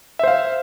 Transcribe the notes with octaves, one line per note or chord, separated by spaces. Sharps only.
C5 E5 F5